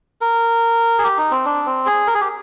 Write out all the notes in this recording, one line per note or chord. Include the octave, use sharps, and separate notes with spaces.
A#4
G#4
G4
D#4
C4
D4
C4
G#4
A#4
G#4
G4